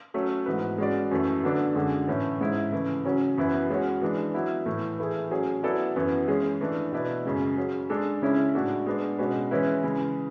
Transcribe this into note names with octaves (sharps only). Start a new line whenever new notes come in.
F#3 A3 C#4
G#2 E3 B3 F#4 B4
G#3 C#4 F#4 B4 D5
F#2 E3 A3
D3 F#3 B3 D4 A4
F#2 D3 G#3
A2 E3 A3 C#4
G#2 G#3 C#4 E4
C#3 E3 A3
C#3 F#3 C#4
F#2 E3 B3 E4 B4
G#3 C#4 F#4 C#5
E3 G#3 D4
F#3 B3 E4 B4
A2 E3 A3
E3 A3 E4 G#4
F#3 C#4 G#4 C#5
F#3 B3 E4 A4 D5
F#2 E3 B3 E4
E3 G#3 C#4 G#4
E3 A3 D4
B2 A3 E4 B4 D5
F#2 C#3 G#3
F#3 C#4 G#4
G#3 D4 A4
C#3 G#3 C#4 E4
A2 G#3 D4 F#4 A4
G#3 B3 D4
B2 G#3 C#4 F#4 B4
E3 G#3 C#4 E4 B4
C#3 E3 G#3